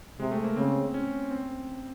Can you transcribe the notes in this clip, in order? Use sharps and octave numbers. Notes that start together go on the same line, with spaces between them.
C3 G#3
A3
A#3
C#3 C4
C#4
C4